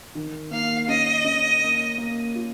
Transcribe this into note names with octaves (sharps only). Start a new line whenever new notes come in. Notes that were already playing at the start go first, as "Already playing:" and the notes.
D#3
A#3 F5
C#4 D#5
C#4
A#3
A#3
F4